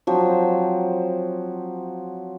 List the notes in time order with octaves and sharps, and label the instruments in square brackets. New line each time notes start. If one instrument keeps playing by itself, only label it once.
[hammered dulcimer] F3 F#3 C4